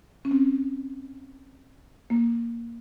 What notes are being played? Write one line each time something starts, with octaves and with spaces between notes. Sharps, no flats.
C#4
C4
A#3